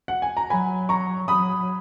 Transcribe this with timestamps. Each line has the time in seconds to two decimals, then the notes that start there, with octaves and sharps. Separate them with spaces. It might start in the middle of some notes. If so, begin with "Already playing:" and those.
0.08 F#5
0.22 G#5
0.37 A#5
0.50 F#3 G#5 B5
0.89 A#5 C#6
1.28 F#3 B5 D#6